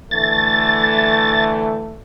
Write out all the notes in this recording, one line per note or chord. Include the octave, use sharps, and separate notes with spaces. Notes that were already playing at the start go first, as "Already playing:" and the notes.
D3 E3 A3 A6